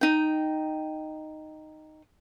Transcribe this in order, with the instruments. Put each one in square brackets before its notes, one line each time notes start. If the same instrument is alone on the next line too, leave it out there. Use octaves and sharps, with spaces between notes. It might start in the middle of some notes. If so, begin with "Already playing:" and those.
[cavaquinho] D#4 G5